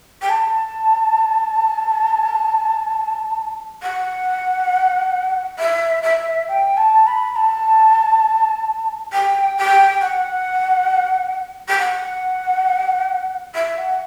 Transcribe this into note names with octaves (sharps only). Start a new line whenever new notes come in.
G5
A5
F#5
E5
E5
G5
A5
B5
A5
G5
G5
F#5
G5
F#5
E5
F#5